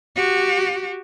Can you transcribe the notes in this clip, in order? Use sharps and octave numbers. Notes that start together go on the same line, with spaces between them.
F#4 G4